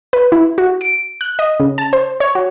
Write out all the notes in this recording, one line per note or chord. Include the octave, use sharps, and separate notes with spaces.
B4
E4
F#4
D7
F#6
D#5
C#3
A5
C5
C#5
F#4